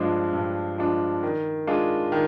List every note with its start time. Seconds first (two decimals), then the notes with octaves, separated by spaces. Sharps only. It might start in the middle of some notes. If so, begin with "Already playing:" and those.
Already playing: G2 F3 G#3 D4
0.33 G2
0.78 F3 G#3 D4
1.23 D#3
1.67 G#3 D4 F4 G#4
2.12 D#3